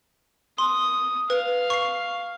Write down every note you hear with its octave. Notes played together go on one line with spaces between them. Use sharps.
C6 D#6
B4 F5
C#6 C7